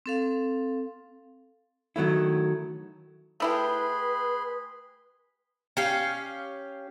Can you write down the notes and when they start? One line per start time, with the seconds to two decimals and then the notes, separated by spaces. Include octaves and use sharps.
0.06 C4 A4 F5
1.96 D#3 F#3 A3 E4
3.40 A3 E4 G4 G#4 B4 B5 C6
5.77 C#4 G4 F5